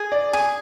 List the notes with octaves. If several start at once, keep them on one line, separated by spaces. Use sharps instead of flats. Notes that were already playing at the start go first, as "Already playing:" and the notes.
Already playing: G#4
D5
G#4 G#5